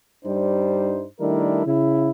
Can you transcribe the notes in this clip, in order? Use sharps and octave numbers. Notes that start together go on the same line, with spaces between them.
G2 G3 D4 D#4 C5
D#3 G3 A3 D4 E4 A#4
C#3 E4